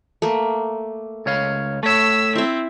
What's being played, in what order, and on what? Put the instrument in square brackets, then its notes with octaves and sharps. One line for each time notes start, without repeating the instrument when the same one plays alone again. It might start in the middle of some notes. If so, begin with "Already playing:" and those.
[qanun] A3 A#3
[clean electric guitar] C#2 C#5 F5
[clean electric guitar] A3 C#5 [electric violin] E6 B6
[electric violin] C4 [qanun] E4 E5